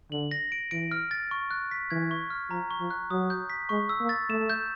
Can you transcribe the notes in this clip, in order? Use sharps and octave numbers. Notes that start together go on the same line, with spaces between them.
D3 F#7
A#6
D7
E3 D7
F6
A6
C#6
F#6
B6
E3 G#6
C#6
F6
F3 A#5
C#6
F3
F#6
F#3 D#6
G6
B6
G#3 C#6
E6
A#3
A6
A3 E7
G6